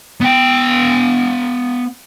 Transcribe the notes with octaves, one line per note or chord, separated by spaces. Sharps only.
B3 G5